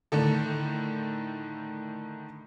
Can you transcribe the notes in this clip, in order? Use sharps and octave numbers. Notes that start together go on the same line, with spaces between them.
A2 D3 D#3 A4